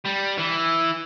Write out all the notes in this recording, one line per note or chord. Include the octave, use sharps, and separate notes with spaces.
G3
E3